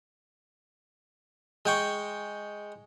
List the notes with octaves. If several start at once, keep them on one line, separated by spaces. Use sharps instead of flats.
G#3 G5 C#6